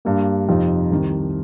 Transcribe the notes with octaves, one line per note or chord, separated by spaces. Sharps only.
G2 G3 A#3
F2 C3 F3 D#4
C2 C3 D#3